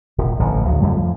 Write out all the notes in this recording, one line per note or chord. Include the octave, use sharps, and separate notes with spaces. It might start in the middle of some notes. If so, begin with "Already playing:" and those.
D#1 C3
A1 A2 D3 F3
D2 C#3 F#3
F2 C#3 G3 A3
F3